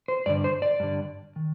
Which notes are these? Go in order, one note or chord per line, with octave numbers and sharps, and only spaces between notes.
C5
G2 D3 D5
C5
D5
G2 D3
D#3